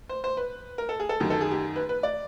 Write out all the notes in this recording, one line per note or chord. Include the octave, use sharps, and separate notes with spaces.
C5
C5
B4
A#4
A4
G#4
A4
F#2 D#3 G4
A4
G#4
G4
B4
B4
D5